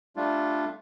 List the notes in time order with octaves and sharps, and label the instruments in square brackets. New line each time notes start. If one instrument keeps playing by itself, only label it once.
[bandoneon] G3 A3 D4 F4